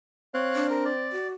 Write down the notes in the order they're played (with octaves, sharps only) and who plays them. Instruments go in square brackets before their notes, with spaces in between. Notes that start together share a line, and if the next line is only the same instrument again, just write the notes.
[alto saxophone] C4 [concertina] C#5 F5 F#6
[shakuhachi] D4
[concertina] A#4
D5
[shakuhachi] F#4